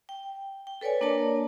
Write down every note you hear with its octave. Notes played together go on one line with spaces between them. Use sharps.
G5
G5
A4 B4 C#5 D5 G#5
A#3 D4 A#4 C#5 D5 A5